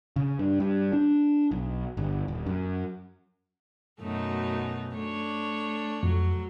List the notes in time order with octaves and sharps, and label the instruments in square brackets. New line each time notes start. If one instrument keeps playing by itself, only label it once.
[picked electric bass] C#3
G2
G2
D4
B1
G1
D#1
F#2
[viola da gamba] F#2 B2 [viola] A3 D#4
[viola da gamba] A3 [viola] D4 C#5
[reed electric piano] F2 [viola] F#3